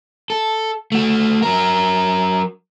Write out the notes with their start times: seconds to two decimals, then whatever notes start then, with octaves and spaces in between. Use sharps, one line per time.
0.30 A4
0.92 A3 F#4
1.42 F#3 A#4